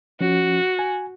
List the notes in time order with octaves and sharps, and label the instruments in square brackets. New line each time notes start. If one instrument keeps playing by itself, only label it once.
[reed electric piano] F3 C#4 [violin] F#4
[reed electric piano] G#5